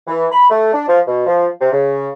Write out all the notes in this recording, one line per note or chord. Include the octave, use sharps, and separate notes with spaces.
E3
B5
A3
D4
F3
B2
F3
C3
C#3